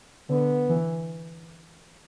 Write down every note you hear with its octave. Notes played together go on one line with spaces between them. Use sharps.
D3 B3
E3